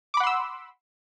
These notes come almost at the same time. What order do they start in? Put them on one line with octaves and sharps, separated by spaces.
D6 B5 F#5 C6 E6